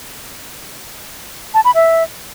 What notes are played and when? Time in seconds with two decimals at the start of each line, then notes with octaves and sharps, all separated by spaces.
1.54 A5
1.65 B5
1.75 E5